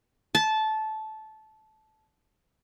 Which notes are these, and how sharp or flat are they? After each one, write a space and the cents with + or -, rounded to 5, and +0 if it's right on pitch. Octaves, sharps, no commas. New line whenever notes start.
A5 -15